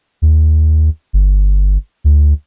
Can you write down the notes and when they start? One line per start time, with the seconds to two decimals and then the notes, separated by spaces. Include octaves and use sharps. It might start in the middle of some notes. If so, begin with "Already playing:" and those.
0.22 D#2
1.13 G1
2.04 D2